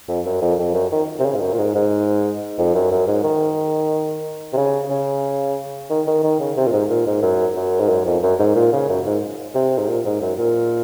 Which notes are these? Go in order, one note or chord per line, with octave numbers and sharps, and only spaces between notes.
F2
F#2
F2
F2
F#2
D#3
C3
C#3
G#2
F#2
A#2
G#2
G#2
F2
F#2
F#2
G#2
D#3
C3
C#3
C#3
D#3
D#3
D#3
C#3
C3
A#2
G#2
A#2
G#2
F#2
F#2
G#2
F#2
F2
F#2
G#2
A#2
C#3
F#2
G#2
C3
G#2
A#2
G#2
F#2
A#2